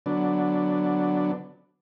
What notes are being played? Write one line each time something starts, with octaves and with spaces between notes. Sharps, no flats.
D3 F#3 B3 D4